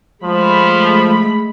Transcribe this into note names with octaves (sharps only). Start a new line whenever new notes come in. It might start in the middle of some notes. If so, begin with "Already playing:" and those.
F3 G#3 A3 B5